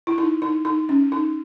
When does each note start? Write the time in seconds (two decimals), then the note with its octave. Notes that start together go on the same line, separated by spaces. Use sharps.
0.07 E4
0.18 D#4
0.42 D#4
0.65 D#4
0.89 C#4
1.12 D#4